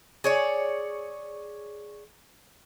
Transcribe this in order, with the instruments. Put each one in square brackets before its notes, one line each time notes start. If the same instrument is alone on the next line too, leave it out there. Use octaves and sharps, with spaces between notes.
[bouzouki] G#4 C#5 D5